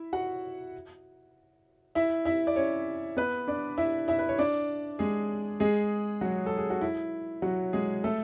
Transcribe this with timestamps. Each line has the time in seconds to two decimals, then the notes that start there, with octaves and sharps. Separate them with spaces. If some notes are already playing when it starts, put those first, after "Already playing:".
Already playing: E4 E5
0.13 F#4 F#5
1.95 E4 E5
2.25 E4 E5
2.47 D5
2.56 C#4 C#5
3.17 B3 B4
3.48 D4 D5
3.78 E4 E5
4.08 E4 E5
4.19 B4
4.29 C#5
4.39 D4 D5
4.99 G#3 G#4
5.60 G#3 G#4
6.21 F#3 F#4
6.46 A4
6.58 G#4
6.70 F#4
6.81 E4
7.42 F#3 F#4
7.73 G#3 G#4
8.04 A3 A4